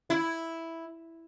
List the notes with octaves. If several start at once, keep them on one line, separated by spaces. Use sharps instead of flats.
E4